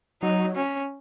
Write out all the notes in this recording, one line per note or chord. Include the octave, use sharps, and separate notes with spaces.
F#3 D#4
C#4